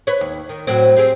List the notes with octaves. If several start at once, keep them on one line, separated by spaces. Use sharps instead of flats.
B4 C#5
D#2
D#3
A2 F#3 C4
C4 G4 G#4